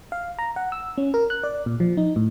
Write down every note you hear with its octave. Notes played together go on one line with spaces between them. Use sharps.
F5
A#5
F#5
E6
C#4
A#4
F#6
D5
A#2
F3
D#4
A2